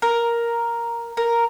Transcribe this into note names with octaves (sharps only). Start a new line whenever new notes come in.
A#4
A#4